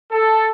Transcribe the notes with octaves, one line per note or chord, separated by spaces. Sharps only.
A4